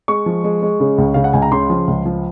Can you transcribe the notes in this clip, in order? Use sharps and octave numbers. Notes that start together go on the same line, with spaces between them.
G#3 C#6
F3
G#3
G#3
C#3
C#2
C#3 F5
F#5
C#2 G#5
A#5
C#3 C6
F3
C#2
F3